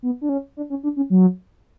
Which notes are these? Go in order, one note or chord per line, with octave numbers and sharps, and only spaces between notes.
B3
D4
C#4
D4
C#4
D4
C#4
F#3